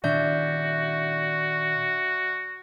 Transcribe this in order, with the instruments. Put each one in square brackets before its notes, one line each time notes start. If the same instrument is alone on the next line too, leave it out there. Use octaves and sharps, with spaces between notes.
[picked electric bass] A#2 D#3 D4 [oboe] F#4 [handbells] D5 E5 G6